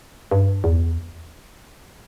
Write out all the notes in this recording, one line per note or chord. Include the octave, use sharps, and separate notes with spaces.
G2
E2